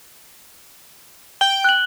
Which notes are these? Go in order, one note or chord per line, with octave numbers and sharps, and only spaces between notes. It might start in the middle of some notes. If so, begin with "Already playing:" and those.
G5 G7
F#6 F#7